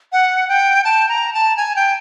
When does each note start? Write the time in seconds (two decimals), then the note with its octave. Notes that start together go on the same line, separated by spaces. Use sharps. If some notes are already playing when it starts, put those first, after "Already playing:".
0.13 F#5
0.49 G5
0.85 A5
1.09 A#5
1.34 A5
1.57 G#5
1.76 G5